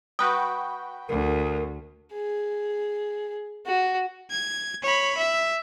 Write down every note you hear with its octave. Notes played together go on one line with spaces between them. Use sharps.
F#4 B4 G5 D#6
D2 A#4
G#4
F#4
G#6
C#5 B5
E5